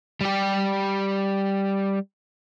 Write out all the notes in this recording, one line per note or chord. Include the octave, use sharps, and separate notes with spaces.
G3 G4